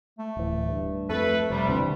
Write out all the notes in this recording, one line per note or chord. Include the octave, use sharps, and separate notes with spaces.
A3
D1 E3
G2
F2 A3 A4 B4
F1 C3 G3
D#2 D3 E3 C4